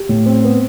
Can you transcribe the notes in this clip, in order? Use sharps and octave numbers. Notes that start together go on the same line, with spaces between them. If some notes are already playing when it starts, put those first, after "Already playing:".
Already playing: G4
A2
C4
B3